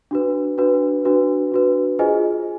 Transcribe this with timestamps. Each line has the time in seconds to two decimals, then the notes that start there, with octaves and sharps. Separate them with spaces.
0.11 D4 F#4 B4
0.58 D4 F#4 B4
1.05 D4 F#4 B4
1.52 D4 F#4 B4
1.99 F4 G#4 C5 D#5 G#5